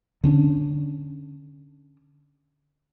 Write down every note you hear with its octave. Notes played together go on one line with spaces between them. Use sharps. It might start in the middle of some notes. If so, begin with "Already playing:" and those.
D3 C#4 D4